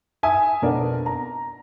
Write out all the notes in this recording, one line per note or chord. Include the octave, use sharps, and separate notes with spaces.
E5 G#5 D#6
F2 B2 D4 A#4 D5 F#5
A#5